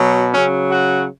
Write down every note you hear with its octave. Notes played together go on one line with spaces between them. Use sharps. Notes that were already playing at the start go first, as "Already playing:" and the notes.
Already playing: B2 F#3
C#3 F#3 C#4
F#4